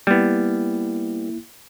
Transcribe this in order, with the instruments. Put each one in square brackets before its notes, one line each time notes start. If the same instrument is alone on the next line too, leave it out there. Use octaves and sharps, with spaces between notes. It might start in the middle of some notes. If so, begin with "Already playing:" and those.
[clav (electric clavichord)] G3 B3 [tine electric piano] A#3 E4